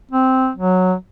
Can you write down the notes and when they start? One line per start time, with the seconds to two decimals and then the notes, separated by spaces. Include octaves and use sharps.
0.11 C4
0.55 F#3